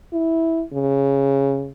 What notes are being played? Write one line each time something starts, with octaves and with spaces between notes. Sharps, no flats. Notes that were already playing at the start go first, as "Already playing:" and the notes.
E4
C#3